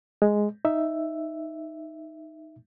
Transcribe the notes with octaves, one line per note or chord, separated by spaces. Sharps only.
G#3
D#4 E5